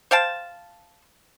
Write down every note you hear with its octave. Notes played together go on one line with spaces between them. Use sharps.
C5 F5 G5 A5